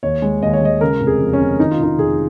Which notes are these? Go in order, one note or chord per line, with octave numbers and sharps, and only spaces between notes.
D#2 C#5
G#3
D#2 D#5
C#5
G#3 D#5
C#3 A#4
F1
G#4
F2
C#4
C#3
D#3 D#4
F4
F1 D#4
F1 G#4